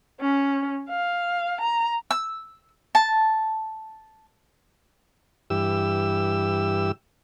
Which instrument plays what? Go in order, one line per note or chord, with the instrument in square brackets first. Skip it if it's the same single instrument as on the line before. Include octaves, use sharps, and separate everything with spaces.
[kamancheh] C#4
F5
A#5
[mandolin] E6
A5
[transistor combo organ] G2 E3 G4 E6